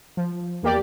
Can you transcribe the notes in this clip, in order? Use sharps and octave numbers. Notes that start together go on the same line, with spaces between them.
F3
E2 A#3 G4 D5